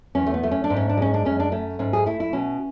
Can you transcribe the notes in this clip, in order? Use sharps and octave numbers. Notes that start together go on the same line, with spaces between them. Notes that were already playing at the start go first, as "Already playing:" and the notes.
E2 C#4
A3
B3
A3
C#4
D4
G#2
C#4
D4
G#3 C#4
D4
F#2 C#4
D4
A3 C#4
G#2 C#4
G#4
A3 E4
E4
B2 C#4